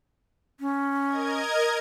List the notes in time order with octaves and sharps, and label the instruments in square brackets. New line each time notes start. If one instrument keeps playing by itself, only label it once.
[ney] C#4
[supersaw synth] A#4 D#5 G#6